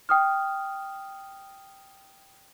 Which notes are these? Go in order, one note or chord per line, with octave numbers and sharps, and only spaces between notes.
G5 D#6 F6